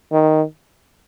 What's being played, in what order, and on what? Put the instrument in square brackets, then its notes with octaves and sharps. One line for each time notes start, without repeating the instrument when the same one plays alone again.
[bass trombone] D#3